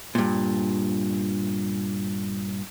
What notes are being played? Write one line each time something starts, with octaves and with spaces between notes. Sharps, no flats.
G2 A#2